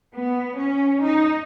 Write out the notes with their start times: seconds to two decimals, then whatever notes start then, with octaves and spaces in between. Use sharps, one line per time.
0.13 B3
0.57 C#4
1.02 D#4